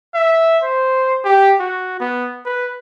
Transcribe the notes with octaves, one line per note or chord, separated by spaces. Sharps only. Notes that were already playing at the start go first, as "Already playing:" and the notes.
E5
C5
G4
F#4
B3
B4